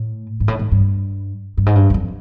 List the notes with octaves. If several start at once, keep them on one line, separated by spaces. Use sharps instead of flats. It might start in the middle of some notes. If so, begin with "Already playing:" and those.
Already playing: A2
G#2
A2
G#2
G2
G2
G#2
G2
E2
F2